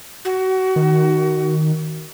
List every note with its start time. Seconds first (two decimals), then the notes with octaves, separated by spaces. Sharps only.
0.25 F#4
0.76 D#3